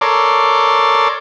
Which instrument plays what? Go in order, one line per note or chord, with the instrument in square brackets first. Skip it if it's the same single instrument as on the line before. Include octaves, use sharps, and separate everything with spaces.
[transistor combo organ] A4 A#4 C#5 D5 C6 D6